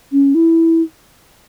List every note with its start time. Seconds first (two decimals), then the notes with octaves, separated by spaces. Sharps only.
0.12 C#4
0.35 E4